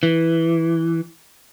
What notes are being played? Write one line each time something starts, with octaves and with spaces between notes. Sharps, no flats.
E3